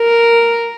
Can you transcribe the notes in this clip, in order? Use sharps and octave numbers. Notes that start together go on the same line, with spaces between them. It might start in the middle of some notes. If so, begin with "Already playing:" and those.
Already playing: A#4